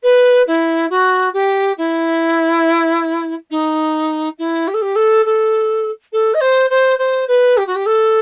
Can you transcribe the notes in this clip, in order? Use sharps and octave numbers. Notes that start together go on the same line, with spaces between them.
B4
E4
F#4
G4
E4
D#4
E4
G4
A4
G4
A4
A4
A4
D#5
C5
C5
C5
B4
G4
F#4
G4
A4